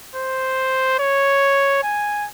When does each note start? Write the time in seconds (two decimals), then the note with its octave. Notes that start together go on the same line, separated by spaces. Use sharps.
0.15 C5
0.99 C#5
1.83 G#5